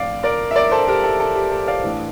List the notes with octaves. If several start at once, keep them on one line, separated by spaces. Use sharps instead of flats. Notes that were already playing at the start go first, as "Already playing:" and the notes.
Already playing: A2 F3 A3 C4 D5 F5
A#4 D5
E5
A#4 D5
A4 C5
G4 A#4
A4
A4
G4
A4
D5 F5
A2 E3 A3 D4